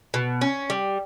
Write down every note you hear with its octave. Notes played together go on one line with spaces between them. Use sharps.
B2
C#4
G3